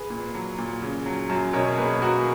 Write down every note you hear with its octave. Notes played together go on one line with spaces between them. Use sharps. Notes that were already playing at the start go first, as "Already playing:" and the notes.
Already playing: G#4 B4
A#2
F#3
A#2
C#3
F#3
F#2
B2 A#4 C#5
A#3 G#4 B4
A#3 F#4 A#4